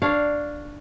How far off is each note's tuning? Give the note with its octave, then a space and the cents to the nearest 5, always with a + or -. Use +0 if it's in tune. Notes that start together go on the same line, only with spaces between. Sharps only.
D4 +0 C#5 +0 F5 +0